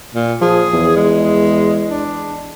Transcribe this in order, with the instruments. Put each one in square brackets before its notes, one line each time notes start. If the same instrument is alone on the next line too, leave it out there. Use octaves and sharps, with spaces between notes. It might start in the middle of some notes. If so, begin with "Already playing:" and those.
[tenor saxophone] A#2
[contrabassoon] F3 [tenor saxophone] G#4
[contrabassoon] E2
[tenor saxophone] G#3
D4